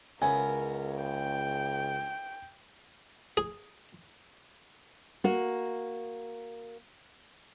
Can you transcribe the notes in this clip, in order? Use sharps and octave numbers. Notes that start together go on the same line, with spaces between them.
C#2 C#3 B3 E4 A#4 G#5
G5
G#4
A#3 F#4